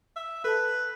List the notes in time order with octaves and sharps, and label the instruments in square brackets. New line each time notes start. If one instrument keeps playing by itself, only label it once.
[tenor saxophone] E5
[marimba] A4 A5 [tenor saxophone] B4